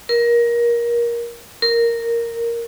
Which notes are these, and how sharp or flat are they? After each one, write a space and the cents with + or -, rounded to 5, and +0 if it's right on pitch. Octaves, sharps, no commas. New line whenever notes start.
A#4 +20
A#4 -5